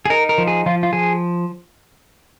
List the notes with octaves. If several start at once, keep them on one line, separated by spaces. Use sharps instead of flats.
G#4
D#4 A#4
A#4
F3
G#4
F3 F4
F4
F3 G#4